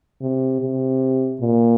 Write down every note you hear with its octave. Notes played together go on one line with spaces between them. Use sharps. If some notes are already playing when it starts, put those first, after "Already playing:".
C3
C3
A#2